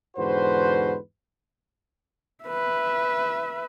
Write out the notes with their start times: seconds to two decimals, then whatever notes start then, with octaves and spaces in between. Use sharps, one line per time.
0.17 E2 G#2 D3 F#4 B4 C5
2.44 B4 E5